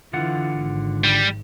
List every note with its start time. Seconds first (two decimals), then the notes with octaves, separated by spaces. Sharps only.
0.13 D3 E3 F4 F#5
0.56 G#1
1.04 G3